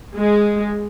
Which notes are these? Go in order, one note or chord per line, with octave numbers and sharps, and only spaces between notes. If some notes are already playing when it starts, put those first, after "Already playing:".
G#3